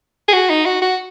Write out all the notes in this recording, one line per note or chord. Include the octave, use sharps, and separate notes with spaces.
G#4
F#4
D#4
F#4
F#4